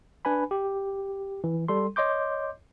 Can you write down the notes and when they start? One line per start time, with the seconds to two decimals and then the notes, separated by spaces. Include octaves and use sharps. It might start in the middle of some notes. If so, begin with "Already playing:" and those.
0.25 D4 B4 G#5 B5
0.51 G4
1.44 E3
1.68 G3 A4 C6
1.96 C#5 D#5 C6 D6 G6